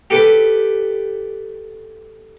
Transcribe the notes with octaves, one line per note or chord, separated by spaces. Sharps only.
G4 A4 B4